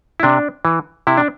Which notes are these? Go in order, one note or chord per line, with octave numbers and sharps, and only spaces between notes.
E4
C3 D4
E3
C3 E4
D4